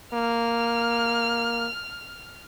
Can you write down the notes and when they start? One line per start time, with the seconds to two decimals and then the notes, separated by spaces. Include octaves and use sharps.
0.13 A#3 F6